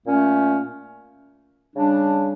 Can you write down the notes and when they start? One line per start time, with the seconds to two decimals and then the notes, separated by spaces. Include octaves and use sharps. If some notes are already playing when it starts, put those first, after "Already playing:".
0.06 A#2 A3 C#4
1.76 C#3 G3 D4